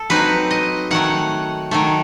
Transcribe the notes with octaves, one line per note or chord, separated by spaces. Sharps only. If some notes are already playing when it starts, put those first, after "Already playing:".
Already playing: A4
F#3 C4 D#4 B4
D#5
D#3 F#3 A3 F#5
D#3 F#3 A3